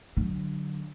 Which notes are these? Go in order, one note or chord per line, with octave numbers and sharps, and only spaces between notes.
D3 F#3